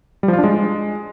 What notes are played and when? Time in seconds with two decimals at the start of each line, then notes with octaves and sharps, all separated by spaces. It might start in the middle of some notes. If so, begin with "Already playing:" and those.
0.23 G3
0.28 F3
0.33 F4
0.38 D4
0.44 G#3